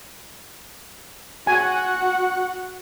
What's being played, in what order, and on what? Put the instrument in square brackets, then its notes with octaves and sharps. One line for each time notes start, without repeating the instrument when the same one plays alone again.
[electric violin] F#4 F#5 [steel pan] G#5